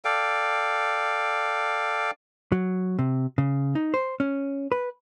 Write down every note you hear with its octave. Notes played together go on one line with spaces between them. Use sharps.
A4 D5 F5 G5
F#3
C3
C#3
D#4
C5
C#4
B4